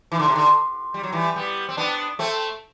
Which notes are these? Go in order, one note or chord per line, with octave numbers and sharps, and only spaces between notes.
E3
D3
C3
D3
G3
F#3
E3 G3
G3 B3
C4
B3 D4
A3 C4